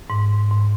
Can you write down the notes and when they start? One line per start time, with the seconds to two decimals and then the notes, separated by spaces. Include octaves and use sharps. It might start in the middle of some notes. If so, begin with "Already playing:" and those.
0.10 G#2
0.51 G#2